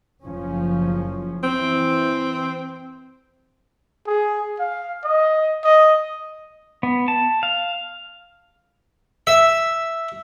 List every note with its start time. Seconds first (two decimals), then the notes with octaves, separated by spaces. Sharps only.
0.26 F#1 F3 C#4
1.43 E3 C4
4.07 G#4
4.60 F5
5.04 D#5
5.64 D#5
6.83 B3
7.08 A5
7.43 F5
9.27 E5